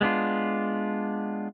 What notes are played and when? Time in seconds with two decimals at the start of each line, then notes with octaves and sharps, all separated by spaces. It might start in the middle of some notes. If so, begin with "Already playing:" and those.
0.01 G#3 B3 D4 F4